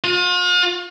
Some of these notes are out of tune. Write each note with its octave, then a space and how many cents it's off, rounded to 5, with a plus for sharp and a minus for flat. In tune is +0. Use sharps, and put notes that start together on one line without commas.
F4 +40